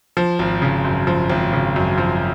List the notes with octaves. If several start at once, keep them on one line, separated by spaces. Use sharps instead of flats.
F3
G#1
C#3
F#2
F3
G#1
C#3
F#2
F3